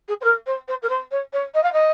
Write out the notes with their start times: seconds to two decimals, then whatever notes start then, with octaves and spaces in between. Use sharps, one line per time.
0.08 G#4
0.21 C5
0.24 A#4
0.46 C5
0.68 C5
0.82 A#4
0.89 C5
1.11 C#5
1.33 C#5
1.54 D#5
1.63 F5
1.73 D#5